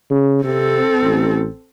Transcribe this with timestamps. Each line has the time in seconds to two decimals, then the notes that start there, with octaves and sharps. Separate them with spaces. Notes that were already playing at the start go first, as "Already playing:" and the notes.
0.11 C#3
0.44 C3 C4 A4
1.03 A1